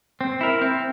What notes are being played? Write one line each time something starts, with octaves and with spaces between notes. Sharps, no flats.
C4
E4 A#4
C4